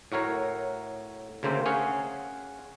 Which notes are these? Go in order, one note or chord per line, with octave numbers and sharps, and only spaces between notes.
A2 F#4 A#4 C#5
D2 C#3 A#3 C5 E5 G5
C#4 G#4 C#5 F5 F#5